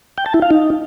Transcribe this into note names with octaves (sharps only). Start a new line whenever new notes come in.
G5
A5
E4
F5
D#4